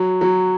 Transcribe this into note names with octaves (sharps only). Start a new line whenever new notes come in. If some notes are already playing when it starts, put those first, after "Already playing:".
Already playing: F#3
F#3